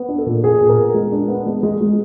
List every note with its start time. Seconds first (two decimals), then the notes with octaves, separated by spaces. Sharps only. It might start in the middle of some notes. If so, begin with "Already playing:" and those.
Already playing: B3
0.09 D4
0.18 A4
0.26 A#2
0.44 A#2 G#4
0.60 A#2
0.69 A#4
0.78 B3
0.94 G#3
1.12 D4
1.28 B3
1.46 G#3
1.63 G#3
1.80 G#3